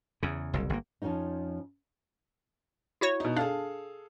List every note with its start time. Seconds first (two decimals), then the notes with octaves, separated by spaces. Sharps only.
0.23 E2 C#3
0.53 F#1 C2
0.70 G1 A#3
1.02 F2 G#2 F3 C#4 D#4
3.01 E4 F#4 C#5
3.20 B2 D#4
3.36 D4 G#4 A4 F5